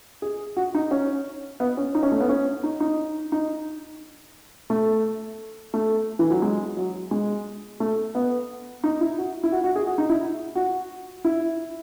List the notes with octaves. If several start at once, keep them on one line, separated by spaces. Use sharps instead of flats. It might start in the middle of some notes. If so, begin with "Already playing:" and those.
G#4
F#4
D#4
C#4
B3
C#4
D#4
C#4
A3
B3
C#4
D#4
D#4
D#4
A3
A3
E3
F#3
G#3
F#3
G#3
A3
B3
D#4
E4
F#4
E4
F#4
F#4
G#4
F#4
D#4
E4
F#4
E4